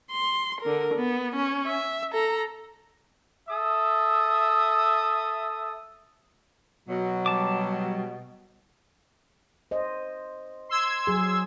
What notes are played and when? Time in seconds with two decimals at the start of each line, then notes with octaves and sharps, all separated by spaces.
0.12 C6
0.61 D3 A#4
0.94 B3
1.36 C#4
1.67 E5
2.12 A4 A#5
3.49 A4 E5 D#6
6.89 B2 F#3
7.26 G3 A5 D6
9.71 C5 D#5
10.69 C6 E6 G#6
11.07 F#3 G#4